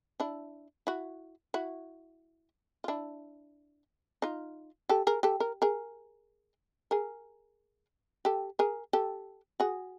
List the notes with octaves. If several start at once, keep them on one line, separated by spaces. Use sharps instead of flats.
D4 E4
E4 F#4
E4 F#4
F4
D4 E4
D#4 F4
G4 A4
G#4 A#4
G4 A4
A#4
G#4 A#4
G#4 A#4
G4 A4
G#4 A#4
G4 A4
F#4 G#4